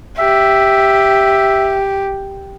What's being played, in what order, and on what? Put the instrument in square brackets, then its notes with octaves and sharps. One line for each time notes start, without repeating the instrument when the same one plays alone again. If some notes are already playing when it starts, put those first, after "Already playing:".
[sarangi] G4 [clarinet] E5